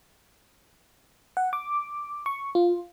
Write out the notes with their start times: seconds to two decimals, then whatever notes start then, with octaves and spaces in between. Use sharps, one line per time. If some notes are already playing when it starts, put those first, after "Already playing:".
1.37 F#5
1.53 D6
2.26 C#6
2.55 F4